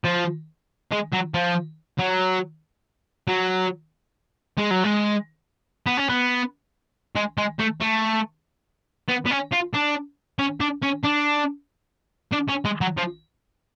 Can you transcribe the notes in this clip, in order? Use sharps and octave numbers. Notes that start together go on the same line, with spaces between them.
F3
G#3
F#3
F3
F#3
F#3
G#3
F#3
G#3
B3
C#4
B3
G#3
G#3
A3
A3
B3
B3
C#4
F4
D4
C#4
D4
C#4
D4
D4
C#4
G#3
F#3
F3